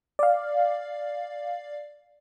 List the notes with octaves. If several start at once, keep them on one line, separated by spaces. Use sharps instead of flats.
D5 F5